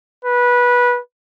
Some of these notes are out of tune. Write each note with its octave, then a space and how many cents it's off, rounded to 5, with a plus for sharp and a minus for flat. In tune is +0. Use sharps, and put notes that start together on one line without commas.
B4 -20